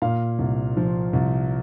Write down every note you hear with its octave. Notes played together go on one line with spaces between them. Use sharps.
A#2 F5
C2
F3
C2